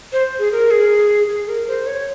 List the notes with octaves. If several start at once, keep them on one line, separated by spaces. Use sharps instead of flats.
C5
G#4
A#4
G#4
G#4
A#4
C5
C#5